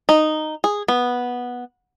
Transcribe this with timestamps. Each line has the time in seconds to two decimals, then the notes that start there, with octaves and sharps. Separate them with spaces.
0.09 D#4
0.64 G#4
0.88 B3